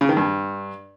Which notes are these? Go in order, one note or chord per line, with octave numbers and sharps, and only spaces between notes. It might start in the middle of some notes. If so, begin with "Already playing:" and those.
C#3
D#3
G2